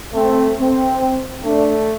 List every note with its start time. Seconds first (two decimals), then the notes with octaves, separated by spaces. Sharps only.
0.14 A3 C4
0.58 C4
1.44 A3 D4